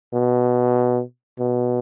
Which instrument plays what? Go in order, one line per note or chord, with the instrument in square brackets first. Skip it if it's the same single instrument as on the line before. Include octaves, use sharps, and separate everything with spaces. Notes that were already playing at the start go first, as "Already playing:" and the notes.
[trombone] B2
B2